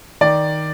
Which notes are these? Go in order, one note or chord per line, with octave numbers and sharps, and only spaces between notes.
D#3 D5